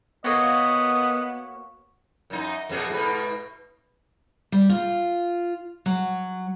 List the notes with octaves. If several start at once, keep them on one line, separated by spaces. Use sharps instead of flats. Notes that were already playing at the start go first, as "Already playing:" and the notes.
A#3 B3 F#4 C#5 D#5
F#2 D#4
F2 B2 G#4
G#2 B2 B4
G3
F4
F#3